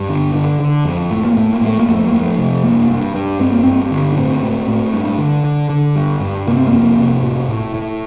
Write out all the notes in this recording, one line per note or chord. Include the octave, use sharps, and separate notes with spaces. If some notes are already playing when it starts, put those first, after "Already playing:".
Already playing: G2
D3
D3
D3
F2
A2 A3
A#3
A2 A3
A#3
A2 A3
A#3
F2
A3
A#3
F2
A3
C3
G2 A#3
G2
G2
G2 C4
A#3
G2 C4
D3
D4
A2 C4
A2
A2
G2
D3
D3
D3
G2
G2
C3 A#3
C4
F2 A#3
C3
A2
A2
A2